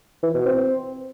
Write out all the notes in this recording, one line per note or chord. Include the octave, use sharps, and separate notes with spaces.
E3
B2
C4